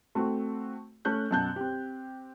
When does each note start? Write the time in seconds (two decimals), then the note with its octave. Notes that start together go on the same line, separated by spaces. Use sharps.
0.15 A3 C4 F#4
1.05 A3 C#4 F#6 G6
1.31 F#2 B2 A5 F#6 G6
1.56 C4 G4